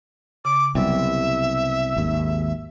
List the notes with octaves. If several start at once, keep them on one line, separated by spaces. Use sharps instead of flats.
C#3 D6
C2 B2 F#3 G3 E5
G#1 D#2